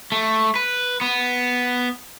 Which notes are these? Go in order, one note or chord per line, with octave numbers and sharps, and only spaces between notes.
A3
B4
B3